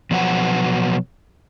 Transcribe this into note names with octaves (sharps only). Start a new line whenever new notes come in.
B2 F3 F#3 B4 F#5